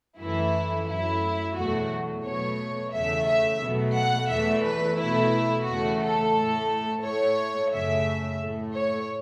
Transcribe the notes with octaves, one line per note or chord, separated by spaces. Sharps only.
F#2 E3 A3 E4
F#2 F#3 A3 E4
E2 B2 F#3 A3 F#4
B2 F#3 A3 C#5
E2 C#3 A3 E5
E5
B2 F#3 A3
F#5
E2 E3 A3 E5
B4
B2 A3 E4
E2 C#3 A3 F#4
A4
A2 A3
A2 A3 C#5
F#2 C#3 A3 E5
A2 A3
C#5